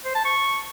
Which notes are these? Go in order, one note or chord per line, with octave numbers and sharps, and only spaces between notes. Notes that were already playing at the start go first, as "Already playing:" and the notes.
C5
A5
C#6